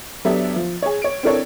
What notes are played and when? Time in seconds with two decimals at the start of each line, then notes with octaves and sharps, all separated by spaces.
0.25 F#3 B3 D4 G4 A4 E5
0.56 F3
0.82 G#4 C#5
1.02 C#5 D7
1.23 C4 D4 E4 A4 A#4 C#5